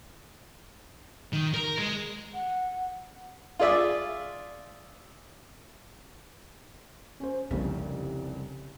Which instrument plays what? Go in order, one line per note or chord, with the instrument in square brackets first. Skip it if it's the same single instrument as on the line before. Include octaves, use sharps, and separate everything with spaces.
[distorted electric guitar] D#3
A#4
G#3
[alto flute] F#5
[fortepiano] F4 G#4 D5 E5
[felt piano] C#4 C5
[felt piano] F1 C2 [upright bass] C#3